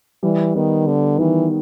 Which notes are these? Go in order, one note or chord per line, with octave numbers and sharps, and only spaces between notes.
E3 G3
D#3 B3
D3 B3
D#3 E3